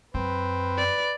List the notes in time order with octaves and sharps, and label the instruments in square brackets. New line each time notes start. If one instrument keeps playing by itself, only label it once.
[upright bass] F#2 [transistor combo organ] C4 [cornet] B4
[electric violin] D5